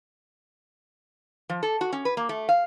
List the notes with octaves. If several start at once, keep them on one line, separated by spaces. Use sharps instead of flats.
F3
A4
F#4
C#4
B4
A#3
A3
F5